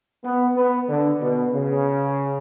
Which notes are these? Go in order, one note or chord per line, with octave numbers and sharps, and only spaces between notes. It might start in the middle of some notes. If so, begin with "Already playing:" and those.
B3
B3
D3
B2
C#3